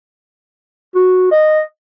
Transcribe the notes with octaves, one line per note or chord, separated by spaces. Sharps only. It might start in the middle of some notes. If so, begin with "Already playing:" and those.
F#4
D#5